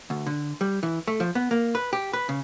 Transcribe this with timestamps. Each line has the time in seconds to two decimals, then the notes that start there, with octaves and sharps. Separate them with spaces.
0.10 D2
0.26 D3
0.61 G3
0.83 E3
1.08 A3
1.20 F3
1.35 B3
1.51 A#3
1.75 B4
1.93 G4
2.13 B4
2.29 C#3